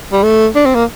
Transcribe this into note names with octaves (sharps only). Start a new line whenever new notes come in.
G3
A3
D4
C4
A#3